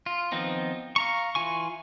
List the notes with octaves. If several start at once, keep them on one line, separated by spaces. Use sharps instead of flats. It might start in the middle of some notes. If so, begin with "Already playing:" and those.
F4
D#3 F3 B3 C4 D#4
F5 A#5 C#6
E3 F4 G#5 C#6